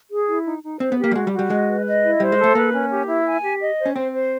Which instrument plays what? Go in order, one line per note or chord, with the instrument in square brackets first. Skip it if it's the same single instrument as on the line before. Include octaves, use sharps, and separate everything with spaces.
[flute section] G#4
E4
D#4
D#4
[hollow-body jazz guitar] C4 [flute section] C5
[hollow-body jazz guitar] B3
[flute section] G4
[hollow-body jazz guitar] A#3
G3
[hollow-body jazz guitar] G#3 [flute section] F#4
[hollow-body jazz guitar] G3
[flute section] F#4
[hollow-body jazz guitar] G3
[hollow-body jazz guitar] G#3 [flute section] D#5
[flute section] B4
D#5
E4
[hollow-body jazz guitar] G3 [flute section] C5
[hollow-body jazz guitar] G#3
[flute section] A4
[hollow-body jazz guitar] A3
[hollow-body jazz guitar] A#3 [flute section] B4
[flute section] C#4
G4
E4
G#5
G4
D#5
C5
[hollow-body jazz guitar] C#4
[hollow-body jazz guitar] C4 [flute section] C5
[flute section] C5